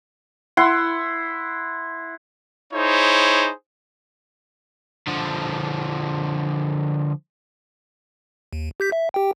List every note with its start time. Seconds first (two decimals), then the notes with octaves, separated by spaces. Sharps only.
0.57 E4 F#5 C6
2.73 D#4 E4 G#4 C5 C#5
5.08 D3 F3
8.53 D#2
8.80 G4 G6 B6
8.92 E5
9.14 G4 G5